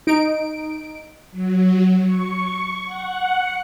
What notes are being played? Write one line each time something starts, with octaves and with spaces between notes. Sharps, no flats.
D#4 D7
F#3
C#6
F#5